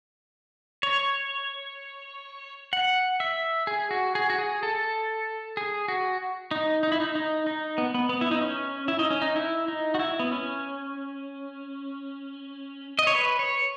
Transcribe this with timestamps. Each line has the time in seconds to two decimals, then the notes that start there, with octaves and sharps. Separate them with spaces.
0.83 C#5
2.73 F#5
3.20 E5
3.67 G#4
3.91 F#4
4.15 G#4
4.30 F#4
4.39 G#4
4.63 A4
5.57 G#4
5.88 F#4
6.51 D#4
6.83 D#4
6.92 E4
7.00 D#4
7.15 D#4
7.47 D#4
7.78 B3
7.94 B3
8.09 B3
8.21 E4
8.31 D#4
8.41 C#4
8.88 E4
8.99 D#4
9.10 C#4
9.22 D#4
9.36 E4
9.68 D#4
9.95 F#4
10.00 E4
10.20 B3
10.31 C#4
12.99 D#5
13.07 C#5
13.15 B4
13.39 C#5